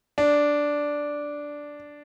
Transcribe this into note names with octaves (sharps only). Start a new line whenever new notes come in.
D4